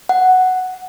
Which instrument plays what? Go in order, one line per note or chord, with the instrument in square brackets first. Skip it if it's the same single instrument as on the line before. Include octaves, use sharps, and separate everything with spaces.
[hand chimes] F#5